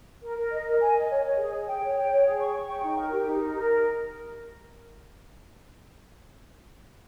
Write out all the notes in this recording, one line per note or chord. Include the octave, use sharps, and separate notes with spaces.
A#4
A#4
D#5
A#4
G#5
D#5
C#5
C#5
G#4
G#4
G5
C#5
G5
C#5
G#4
C#6
C#6
G5
D#4
A#4
G4
D#4
A#4
A#4